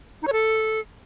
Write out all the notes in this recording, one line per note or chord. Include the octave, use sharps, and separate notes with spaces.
D#4
C#5
A4